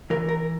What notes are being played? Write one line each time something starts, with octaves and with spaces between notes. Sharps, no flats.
E3 A#4
A#4